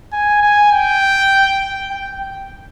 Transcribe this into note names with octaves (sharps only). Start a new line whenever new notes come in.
G#5
G#5
G5
G5